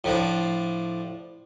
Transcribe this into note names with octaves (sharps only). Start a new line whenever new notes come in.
A2 F3 D4